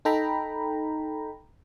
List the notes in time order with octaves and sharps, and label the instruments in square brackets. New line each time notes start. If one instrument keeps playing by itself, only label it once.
[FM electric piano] D#4 A4 G5 A#5 B5